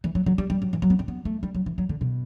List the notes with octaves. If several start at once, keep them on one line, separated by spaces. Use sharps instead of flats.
E3
F#3
F#3
G3
G3
F#3
E3
F#3
B3
C4
B3
A3
G3
F#3
E3
F#3
D3
B2